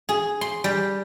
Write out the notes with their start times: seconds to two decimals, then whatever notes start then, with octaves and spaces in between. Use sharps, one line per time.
0.09 G#4
0.41 C6
0.64 G3